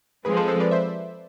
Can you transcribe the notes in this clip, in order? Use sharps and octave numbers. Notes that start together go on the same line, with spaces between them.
F3 G#3 C4 G#4 B4
A4 C5
A4 C5
B4 D5
C5 E5